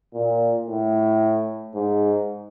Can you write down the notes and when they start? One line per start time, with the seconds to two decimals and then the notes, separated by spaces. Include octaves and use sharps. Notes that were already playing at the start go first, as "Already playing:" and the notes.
0.14 A#2
0.67 A2
1.75 G#2